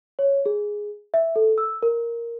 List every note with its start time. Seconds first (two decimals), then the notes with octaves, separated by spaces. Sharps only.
0.19 C#5
0.46 G#4
1.14 E5
1.36 A4
1.58 E6
1.83 A#4